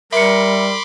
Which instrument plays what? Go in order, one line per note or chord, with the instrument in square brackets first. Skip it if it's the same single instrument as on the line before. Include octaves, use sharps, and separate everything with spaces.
[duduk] G3 [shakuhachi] A#4 [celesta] E5 C#7 [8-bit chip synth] B5 C6 D6